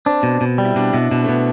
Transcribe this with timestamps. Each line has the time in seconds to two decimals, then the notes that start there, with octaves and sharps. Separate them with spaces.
0.06 C4 D4
0.23 B2
0.41 B2
0.58 G3
0.65 E4
0.75 B2 D4
0.93 B2 E4
1.11 B2 D4
1.24 A3
1.28 B2 B3